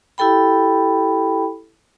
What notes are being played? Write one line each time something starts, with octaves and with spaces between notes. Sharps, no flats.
E4 G4 A4 G5 B5